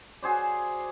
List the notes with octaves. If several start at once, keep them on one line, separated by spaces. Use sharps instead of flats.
F#4 G#4 C5 D5